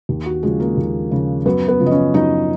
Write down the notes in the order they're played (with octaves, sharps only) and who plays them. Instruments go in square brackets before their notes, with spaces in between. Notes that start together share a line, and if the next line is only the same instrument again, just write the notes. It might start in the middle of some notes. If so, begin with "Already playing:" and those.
[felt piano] D#2
F#4
C#3 F3 G#3 G#4
A#3 A#4
D#2
C#3 F3
F#2 B3 B4
B3 B4
C#3 F3
D#5
C#4 C#5
F#2 D#4 D#5